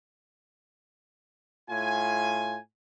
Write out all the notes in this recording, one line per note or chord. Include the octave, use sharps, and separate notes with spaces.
A2 F4 G#5